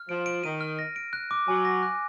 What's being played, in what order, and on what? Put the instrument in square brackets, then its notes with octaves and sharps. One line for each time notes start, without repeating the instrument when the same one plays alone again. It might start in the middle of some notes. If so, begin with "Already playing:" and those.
Already playing: [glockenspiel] F6
[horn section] F3 [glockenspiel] D7
[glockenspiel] D7
[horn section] D#3 [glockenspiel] D#7
[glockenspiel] F6
A#6
D7
F#6
D6
[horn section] F#3 [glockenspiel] G#5
[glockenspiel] A#6
F#6